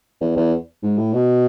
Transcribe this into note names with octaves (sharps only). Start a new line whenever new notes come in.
E2
E2
G#2
A2
B2